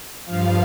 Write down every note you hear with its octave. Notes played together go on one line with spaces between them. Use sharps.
G2 F3 F5